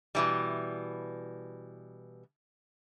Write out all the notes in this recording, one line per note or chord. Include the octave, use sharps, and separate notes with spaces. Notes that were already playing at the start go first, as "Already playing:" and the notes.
B2 E3 G3